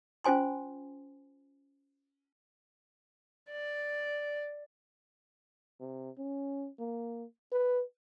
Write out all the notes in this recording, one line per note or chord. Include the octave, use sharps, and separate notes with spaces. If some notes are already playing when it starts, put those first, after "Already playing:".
C#4 F4 C5 G#5 C6
D5
C3
C#4
A#3
B4